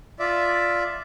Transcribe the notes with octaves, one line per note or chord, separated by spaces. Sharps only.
F4 D5 E5